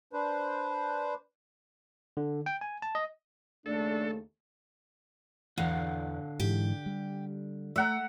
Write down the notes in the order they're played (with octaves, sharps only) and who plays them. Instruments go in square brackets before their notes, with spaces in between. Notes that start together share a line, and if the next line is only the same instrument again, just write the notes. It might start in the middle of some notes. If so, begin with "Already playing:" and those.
[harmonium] D4 B4 C5
[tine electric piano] D3
G5
G#5
A5
D#5
[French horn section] D#2 C#3 A3 [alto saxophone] D4 [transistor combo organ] A4
[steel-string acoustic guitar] E2 [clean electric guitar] D3 F5 F#5
[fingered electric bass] G#2 E3 [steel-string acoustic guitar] G4
[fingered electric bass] G3
[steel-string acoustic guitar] A3 [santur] E5 F#5 A#5